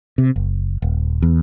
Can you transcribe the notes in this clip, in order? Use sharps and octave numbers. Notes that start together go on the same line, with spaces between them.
C3
F#1
D#1
E2